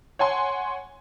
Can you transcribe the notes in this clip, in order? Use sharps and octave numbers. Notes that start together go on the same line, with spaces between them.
C#5 F#5 G#5 C6